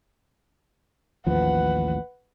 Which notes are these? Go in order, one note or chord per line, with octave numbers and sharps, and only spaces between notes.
A1 D#2 F3 B4 F#5